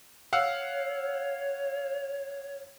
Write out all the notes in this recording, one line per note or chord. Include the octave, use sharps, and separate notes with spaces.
C#5 F5 F#5 E6